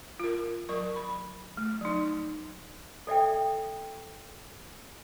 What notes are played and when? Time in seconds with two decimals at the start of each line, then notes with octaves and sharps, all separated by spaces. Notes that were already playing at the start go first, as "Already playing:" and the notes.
0.20 F4 A#4
0.69 F#3 A#4 C#6
0.96 B5
1.57 A3
1.81 F#3 D#4
3.07 A4 D5 E5 G5